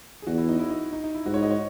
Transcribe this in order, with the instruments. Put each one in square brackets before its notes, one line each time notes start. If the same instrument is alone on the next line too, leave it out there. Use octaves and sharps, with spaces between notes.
[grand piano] G#4
[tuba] E2 [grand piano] F#4
[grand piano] E4
D#4
E4
D#4
D#4
D#4
E4
[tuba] G#2 [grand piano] F#4
[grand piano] C#5
D#5
C#5